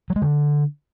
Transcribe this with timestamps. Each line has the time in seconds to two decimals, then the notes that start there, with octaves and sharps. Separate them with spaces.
0.10 F#3
0.16 G#3
0.22 D3